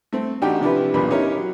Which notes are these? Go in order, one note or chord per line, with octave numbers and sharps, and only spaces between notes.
A3 C4
A1 D4 D#4 F#4 G4 G5
C3 F3 D4 E4 G4 B4
B1 E2 A#2 D4 B5
C#4 D#4 E4 G4 A#4 C#5
F#3